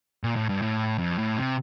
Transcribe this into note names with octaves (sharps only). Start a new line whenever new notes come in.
A#2
A2
G2
A2
F2
A2
C3